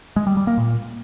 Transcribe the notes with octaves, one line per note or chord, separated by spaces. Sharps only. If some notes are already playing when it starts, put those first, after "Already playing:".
G#3
G3
G3
A#3
A#2